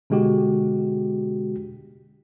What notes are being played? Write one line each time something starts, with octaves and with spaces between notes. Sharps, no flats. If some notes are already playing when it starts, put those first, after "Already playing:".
B2 D3 G#3 F#4 G4